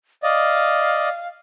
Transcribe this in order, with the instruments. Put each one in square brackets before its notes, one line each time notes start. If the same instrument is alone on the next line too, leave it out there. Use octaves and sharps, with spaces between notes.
[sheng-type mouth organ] D5 D#5 [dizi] F5